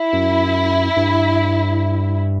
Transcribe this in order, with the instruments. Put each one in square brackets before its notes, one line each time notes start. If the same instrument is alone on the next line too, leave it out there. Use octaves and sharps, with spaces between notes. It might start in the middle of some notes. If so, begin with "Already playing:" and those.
Already playing: [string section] E4
[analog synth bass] F#2
G2